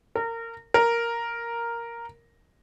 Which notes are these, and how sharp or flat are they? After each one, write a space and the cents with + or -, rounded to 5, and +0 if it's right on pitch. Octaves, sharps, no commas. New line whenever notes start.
A#4 -25
A#4 +0